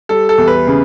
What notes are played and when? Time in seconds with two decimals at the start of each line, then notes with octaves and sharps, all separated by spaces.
0.09 G3 A4
0.29 A4
0.38 E2
0.48 B4
0.67 C#3